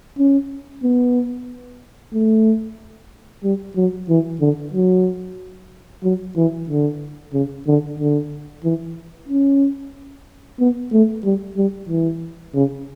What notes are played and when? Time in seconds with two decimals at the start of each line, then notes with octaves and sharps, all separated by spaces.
0.18 C#4
0.84 B3
2.13 A3
3.44 G3
3.76 F#3
4.09 E3
4.41 D3
4.74 F#3
6.04 F#3
6.37 E3
6.69 D3
7.33 C#3
7.67 D3
8.00 D3
8.64 E3
9.29 C#4
10.60 B3
10.93 A3
11.25 G3
11.57 G3
11.89 E3
12.55 C#3